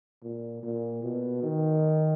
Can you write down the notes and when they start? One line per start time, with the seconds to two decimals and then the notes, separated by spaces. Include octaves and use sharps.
0.22 A#2
0.63 A#2
1.03 B2
1.43 D#3